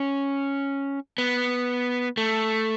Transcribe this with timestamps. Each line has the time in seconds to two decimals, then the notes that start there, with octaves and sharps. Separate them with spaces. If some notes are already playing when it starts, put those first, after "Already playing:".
Already playing: C#4
1.18 B3
2.17 A3